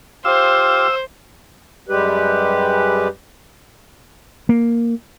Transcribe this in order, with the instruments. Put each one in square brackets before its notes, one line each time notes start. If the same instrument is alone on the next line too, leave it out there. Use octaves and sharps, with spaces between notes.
[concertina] F4 G4 [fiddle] C5 [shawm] F5 [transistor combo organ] E6
[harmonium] F#2 G3 G#3 G4 B4
[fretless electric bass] A#3